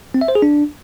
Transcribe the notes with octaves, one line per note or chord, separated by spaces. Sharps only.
C4
E5
C5
G#4
D4